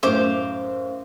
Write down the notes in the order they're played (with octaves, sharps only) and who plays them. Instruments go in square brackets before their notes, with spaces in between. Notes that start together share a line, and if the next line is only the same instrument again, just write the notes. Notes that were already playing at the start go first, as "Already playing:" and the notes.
[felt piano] F#2 A2 [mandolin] C5 F5 D6